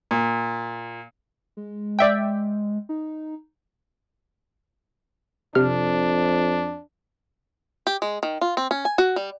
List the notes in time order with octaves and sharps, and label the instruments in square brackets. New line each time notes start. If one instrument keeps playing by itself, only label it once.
[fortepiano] A#2
[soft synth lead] G#3
[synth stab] D5 E5 G5
[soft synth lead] D#4
[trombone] F2 [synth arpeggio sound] C3 F6 [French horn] D4
[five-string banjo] G4
G#3
D#3
F4
C4
C#4
G#5
F#4
G3